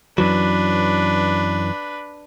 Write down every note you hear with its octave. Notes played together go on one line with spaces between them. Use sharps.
F#2 E3 F#3 D4 B4